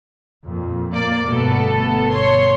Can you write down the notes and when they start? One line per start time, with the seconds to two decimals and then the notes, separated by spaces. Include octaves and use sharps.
0.44 F2 A#2
0.93 A#3 D5
1.28 G1 B2 A3 B3 A4
2.11 C#5 C6